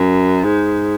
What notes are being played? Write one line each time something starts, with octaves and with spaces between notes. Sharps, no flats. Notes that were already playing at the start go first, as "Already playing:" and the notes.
Already playing: F#2
G#2